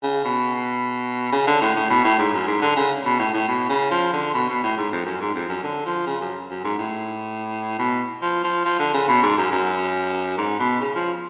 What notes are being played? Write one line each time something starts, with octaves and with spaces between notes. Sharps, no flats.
C#3
B2
C#3
D3
A2
A2
B2
A2
G#2
F#2
G#2
D3
C#3
B2
A2
A2
B2
C#3
F3
D3
B2
B2
A2
G#2
F2
F#2
G#2
F2
F#2
D3
F3
C#3
F#2
F#2
G#2
A2
B2
F3
F3
F3
D3
C#3
B2
G#2
F#2
F#2
G#2
B2
C#3
F3